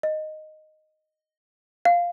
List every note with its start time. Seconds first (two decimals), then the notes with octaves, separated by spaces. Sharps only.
0.03 D#5
1.85 F5